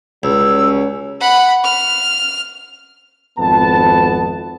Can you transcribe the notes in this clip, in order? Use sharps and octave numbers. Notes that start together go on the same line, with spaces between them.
C#2 F#3 G3 C#4 E6
F#5 B5
F6
G#1 F2 B3 A5